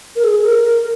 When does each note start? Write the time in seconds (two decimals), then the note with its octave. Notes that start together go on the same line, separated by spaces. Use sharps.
0.16 A#4
0.24 G#4
0.44 A#4
0.64 A#4